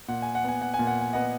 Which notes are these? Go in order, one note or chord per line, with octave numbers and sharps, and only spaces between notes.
A#2 F#5
G#5
F#5
B3 G#5
F#5
G#5
A#2
F#5
G#5
B3 D#5 F#5